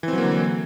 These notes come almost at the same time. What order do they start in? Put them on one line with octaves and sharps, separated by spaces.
E3 C4 F#3 A#3 D3